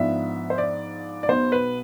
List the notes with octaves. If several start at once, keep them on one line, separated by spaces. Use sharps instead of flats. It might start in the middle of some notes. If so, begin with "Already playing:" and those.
Already playing: G#2 F3 B3 D4 E5
C5
D5
D5
B1 B2 B3 C5
B4